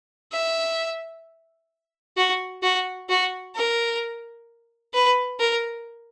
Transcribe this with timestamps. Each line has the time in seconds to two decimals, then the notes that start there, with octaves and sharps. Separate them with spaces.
0.33 E5
2.17 F#4
2.63 F#4
3.09 F#4
3.56 A#4
4.94 B4
5.40 A#4